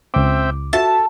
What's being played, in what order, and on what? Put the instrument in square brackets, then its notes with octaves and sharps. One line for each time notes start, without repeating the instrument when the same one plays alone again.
[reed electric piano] C#2 D6 [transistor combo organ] C4 E5 G5
[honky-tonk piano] F#4 E5 [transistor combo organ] A4 [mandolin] A5